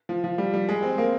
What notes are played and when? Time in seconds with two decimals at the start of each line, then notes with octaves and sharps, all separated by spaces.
0.09 F3
0.24 F3
0.38 G3
0.54 G3
0.69 G#3
0.82 C4
0.98 A#3